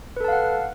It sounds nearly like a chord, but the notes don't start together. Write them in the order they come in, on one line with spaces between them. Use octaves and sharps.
B4 A4 A5 F5 F#5